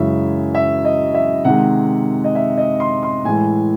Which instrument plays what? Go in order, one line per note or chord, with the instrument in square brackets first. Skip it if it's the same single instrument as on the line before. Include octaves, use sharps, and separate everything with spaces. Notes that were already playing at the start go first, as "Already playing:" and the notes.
Already playing: [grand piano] F#2 C#3 E3 G#3 E5
E5
D#5
E5
C3 D#3 G#3 F#5
D#5
E5
D#5
C6
C6
A2 E3 G#3 G#5